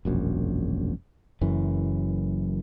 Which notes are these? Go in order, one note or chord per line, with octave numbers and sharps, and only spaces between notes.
E1 A#1 F#2
F#1 F#2 E3